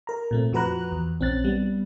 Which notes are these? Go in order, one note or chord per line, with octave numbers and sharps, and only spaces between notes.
A#4 A#5
A#2 A3 C4
F2 F3 F#4 B4 A#5 F#6
E2
A#1 C4 C#4 F#6 A6
G3 B3